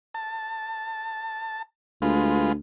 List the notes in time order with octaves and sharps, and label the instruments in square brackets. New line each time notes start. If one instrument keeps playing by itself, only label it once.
[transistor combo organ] A5
[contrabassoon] D2 [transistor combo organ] G#3 F4 B4